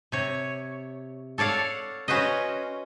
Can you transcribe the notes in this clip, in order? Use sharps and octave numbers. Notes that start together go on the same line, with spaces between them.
C3 C#5
A4 C#5 D5 F5 F#5
C#4 F#4 B4 C5 D#5